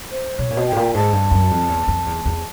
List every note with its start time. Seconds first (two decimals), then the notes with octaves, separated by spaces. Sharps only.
0.11 C5
0.39 B2 C#5
0.50 A#2
0.57 B2
0.67 G5
0.72 A2
0.76 A#2
0.94 G#2 A5
1.13 G2
1.31 F#2
1.51 F2
1.69 E2
1.88 F2
2.06 E2
2.25 E2